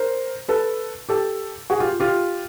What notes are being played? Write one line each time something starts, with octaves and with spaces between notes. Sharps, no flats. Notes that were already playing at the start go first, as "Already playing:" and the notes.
Already playing: A#4 C5
A4 B4
G4 A4
F#4 G#4
F4 G4
F4 G4